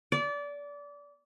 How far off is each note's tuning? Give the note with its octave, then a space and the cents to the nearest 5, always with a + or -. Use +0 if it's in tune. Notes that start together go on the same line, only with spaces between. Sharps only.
D5 -25